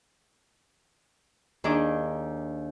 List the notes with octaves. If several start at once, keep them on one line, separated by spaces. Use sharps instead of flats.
D#2 D#3 D4 D#4 G#4 D6